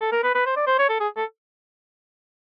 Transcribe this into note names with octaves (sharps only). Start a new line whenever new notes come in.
A4
A#4
B4
B4
C5
D5
C5
C#5
A4
G#4
A4